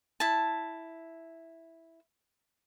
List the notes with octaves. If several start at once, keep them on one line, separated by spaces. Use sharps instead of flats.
E4 A5